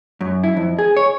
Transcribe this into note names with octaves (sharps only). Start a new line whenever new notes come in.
F#2
E4
F2
G#4
C#5